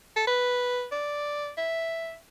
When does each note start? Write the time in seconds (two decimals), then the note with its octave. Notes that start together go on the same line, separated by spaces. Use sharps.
0.16 A4
0.27 B4
0.92 D5
1.58 E5